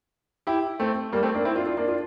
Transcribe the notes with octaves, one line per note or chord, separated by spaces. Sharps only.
E4 G4
A3 C4
G3 A#3
A3 C4
A#3 D4
C4 E4
D4 F4
D4 F4
A#3 D4
D4 F4